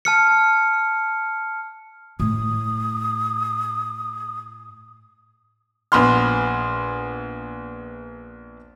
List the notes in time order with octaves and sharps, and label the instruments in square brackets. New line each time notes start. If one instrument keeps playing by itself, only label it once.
[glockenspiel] A5 F6 C#7
[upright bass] A2 [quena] D#6
[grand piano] A#1 B3 B5 C6 F6